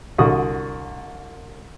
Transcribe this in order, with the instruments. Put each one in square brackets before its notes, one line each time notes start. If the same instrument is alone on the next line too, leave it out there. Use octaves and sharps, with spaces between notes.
[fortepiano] C2 D3 F#4 D#6